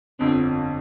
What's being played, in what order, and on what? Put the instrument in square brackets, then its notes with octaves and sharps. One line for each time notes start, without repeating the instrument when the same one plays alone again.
[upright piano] G1 F2 D3 [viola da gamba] C4